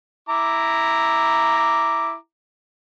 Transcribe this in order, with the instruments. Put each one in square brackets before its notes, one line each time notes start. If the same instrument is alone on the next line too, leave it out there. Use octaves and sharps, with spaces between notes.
[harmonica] E4 A#5 D6